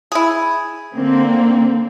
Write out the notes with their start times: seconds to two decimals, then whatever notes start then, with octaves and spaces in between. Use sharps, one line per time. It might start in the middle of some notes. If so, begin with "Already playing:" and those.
0.12 E4 G#4
0.95 D3 A#3 C4